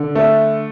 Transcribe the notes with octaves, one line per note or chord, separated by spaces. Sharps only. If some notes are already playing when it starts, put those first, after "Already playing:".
Already playing: D3
A3